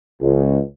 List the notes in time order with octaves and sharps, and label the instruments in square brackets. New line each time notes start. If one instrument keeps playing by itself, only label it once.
[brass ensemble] C#2